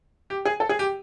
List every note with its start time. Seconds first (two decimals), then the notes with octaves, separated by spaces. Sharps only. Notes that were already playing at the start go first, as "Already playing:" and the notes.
0.30 G4
0.45 G#4
0.60 A4
0.69 G#4
0.79 G4